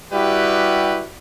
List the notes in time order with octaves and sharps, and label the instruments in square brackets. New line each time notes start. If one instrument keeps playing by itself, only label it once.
[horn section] G3 E4 F#4 G4 B4